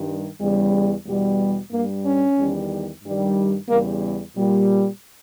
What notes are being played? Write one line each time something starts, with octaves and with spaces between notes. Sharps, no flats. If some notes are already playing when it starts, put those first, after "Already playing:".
Already playing: G2 D#3 G3
E2 C#3 G3
E2 B2 G3
G2 G3 A#3
C#4
E2 D#3 G3
G2 D#3 G3
E2 C#3 G3 A#3
A#2 G3